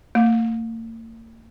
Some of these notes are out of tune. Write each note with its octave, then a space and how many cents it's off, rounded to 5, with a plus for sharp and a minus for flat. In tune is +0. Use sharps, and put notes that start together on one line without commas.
A#3 -45